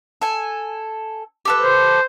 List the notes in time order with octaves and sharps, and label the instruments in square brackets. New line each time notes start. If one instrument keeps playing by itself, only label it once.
[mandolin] A4 G#5
G4 A4 B4
[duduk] C5